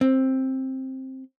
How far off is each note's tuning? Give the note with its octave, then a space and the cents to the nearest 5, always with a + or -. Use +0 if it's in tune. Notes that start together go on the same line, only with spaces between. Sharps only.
C4 +10